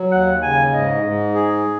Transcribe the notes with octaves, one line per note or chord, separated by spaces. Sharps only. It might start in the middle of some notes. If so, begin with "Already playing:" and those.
Already playing: F#3
D#2 F#5
C#3 G#5
G#2 D#5
G#2
G#4